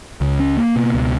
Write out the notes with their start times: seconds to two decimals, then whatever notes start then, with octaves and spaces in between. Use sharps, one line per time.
0.21 C#2
0.40 C#4
0.58 A#3
0.76 B2
0.94 C#2